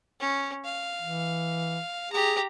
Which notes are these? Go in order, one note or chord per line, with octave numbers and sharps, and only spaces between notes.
C#4
F5
E3
G4 G#4 A#5